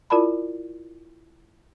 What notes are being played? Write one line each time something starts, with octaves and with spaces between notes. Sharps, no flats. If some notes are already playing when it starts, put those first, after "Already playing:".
E4 F4 A#4 D5 A5 B5